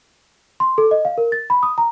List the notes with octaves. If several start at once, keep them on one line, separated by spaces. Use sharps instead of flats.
C6
A4
D#5
F5
A#4
A6
B5
D#6
A#5